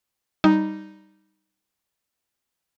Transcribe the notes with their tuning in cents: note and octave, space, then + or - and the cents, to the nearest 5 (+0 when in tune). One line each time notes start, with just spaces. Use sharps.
G3 +0 D#4 +0